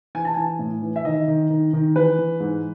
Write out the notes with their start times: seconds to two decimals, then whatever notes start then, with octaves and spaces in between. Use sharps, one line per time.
0.15 E3 G#5
0.25 A5
0.34 E3 G#5
0.59 A2
0.82 E3
0.96 E5
1.05 D#3 D#5
1.28 D#3
1.50 D#3
1.73 D#3
1.96 E3 B4
2.19 E3
2.40 G#2